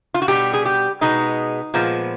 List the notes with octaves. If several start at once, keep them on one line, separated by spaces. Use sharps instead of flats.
F4
F#4
B2 G3 B3 G4
G#4
G4
B2 G#3 B3 D#4
A#2 F3 G#3 B3